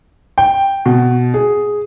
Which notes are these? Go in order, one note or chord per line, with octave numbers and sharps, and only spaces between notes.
G5
B2
G#4